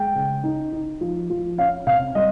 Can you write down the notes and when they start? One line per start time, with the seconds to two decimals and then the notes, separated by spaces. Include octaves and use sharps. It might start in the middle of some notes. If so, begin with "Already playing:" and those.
Already playing: G#3 G5
0.15 C#3
0.44 D#4
0.72 D#4
1.01 F3
1.30 F3
1.58 C#4 F5
1.86 C3 F5
2.15 G3 D#5